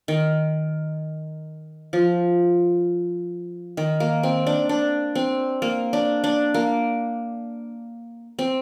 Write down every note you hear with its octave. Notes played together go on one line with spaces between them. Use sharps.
D#3
F3
D#3
A#3
C4
D4
D4
C4
A#3
D4
D4
A#3
C4